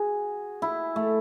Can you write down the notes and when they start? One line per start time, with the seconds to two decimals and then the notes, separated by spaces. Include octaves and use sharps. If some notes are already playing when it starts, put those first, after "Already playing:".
Already playing: F#4 G#4
0.62 E4
0.96 A3